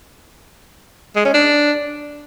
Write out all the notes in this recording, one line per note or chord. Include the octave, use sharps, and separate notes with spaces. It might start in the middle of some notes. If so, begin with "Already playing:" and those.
G#3
C#4
D4